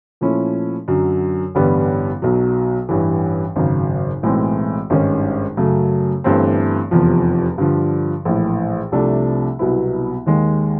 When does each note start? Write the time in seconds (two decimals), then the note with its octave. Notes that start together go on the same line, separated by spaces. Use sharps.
0.21 A#2 F3 A3 C#4 E4
0.88 F#2 D3 F#3
1.55 A1 G2 D3 G3 B3
2.22 B1 B2 F#3
2.89 A1 G2 E3
3.56 G#1 F#2 C#3
4.23 B1 A2 E3 G#3 C4
4.90 G#1 G2 D#3 G#3 C#4
5.57 F#2 C#3 F#3 A3
6.24 G1 G2 E3 A3 C4
6.91 F1 E2 C3 F3
7.58 G2 D3 F3
8.25 A#1 A2 E3
8.92 C2 C3 F3 A3 D4
9.59 C2 B2 F#3 B3 E4
10.26 D#2 D#3 G#3